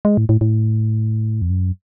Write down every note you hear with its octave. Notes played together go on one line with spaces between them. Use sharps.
G#3
A2
A2
A2
F2
F#2